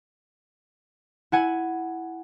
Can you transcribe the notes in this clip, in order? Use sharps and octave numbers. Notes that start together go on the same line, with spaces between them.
E4 F#5 G#5